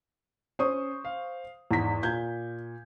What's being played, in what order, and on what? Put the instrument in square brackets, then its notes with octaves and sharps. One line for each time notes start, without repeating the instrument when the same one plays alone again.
[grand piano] C#4 [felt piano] C5 C#6 D#6
[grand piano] F5
[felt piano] E2 B6 [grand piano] G#2
[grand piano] A#2 G#6 [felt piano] G6